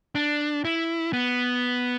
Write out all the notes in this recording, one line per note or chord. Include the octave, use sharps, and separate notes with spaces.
D4
E4
B3